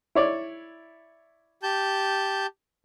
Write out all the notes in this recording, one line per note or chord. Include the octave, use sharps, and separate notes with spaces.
E4 C#5 D5
G4 A5 G6